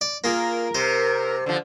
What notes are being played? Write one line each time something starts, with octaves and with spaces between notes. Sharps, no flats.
D5
A#3 F4 G#4 A#4
C3 C5
D3 F3